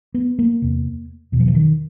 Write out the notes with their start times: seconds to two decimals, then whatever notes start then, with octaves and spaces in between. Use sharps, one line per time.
0.14 B3
0.39 A#3
0.62 E2 C3
1.32 E2 B2
1.40 F3
1.48 E3
1.55 D#3